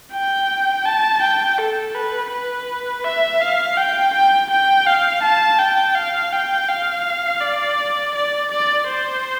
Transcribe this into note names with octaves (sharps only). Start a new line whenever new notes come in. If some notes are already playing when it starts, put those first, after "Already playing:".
G5
A5
G5
A4
B4
B4
E5
F5
G5
G5
G5
F5
A5
G5
F5
G5
F5
D5
D5
D5
C5